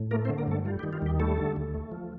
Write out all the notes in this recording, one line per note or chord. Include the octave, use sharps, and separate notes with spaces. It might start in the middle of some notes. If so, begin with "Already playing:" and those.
Already playing: A2
A3 A#3 A#4
C4 C5
D3
A#3 A#4
G2 A3 A4
G3 F4
G4
D#3
F4
D#2 G4
G3 A3 A4
D3
D2
A3
F3